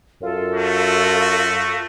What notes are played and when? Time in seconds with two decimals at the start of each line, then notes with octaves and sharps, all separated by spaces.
0.22 F#2 F4 A4
0.53 A3 F#4